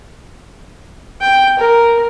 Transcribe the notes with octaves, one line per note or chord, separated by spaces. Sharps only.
G5
A#4